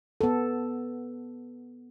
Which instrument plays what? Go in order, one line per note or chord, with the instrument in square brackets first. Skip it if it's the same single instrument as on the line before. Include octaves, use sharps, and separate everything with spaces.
[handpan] B3 A4